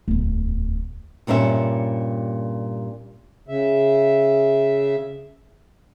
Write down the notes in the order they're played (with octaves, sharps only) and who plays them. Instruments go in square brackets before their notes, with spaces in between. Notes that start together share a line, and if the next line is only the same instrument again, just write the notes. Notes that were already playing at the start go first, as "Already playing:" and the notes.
[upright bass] D1 E2
[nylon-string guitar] G2 A#2 G3 C#4 E5
[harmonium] C#3 E5